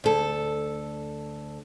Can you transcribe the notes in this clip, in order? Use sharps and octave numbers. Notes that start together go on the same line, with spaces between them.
D2 A4